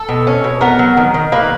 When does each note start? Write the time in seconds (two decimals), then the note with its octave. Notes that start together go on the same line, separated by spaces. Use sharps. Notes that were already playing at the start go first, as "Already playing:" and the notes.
Already playing: A4
0.09 B2
0.27 C#4
0.44 B2
0.61 B3 A#4
0.79 F#3
0.97 D#3
1.14 D#3
1.32 A#3 B4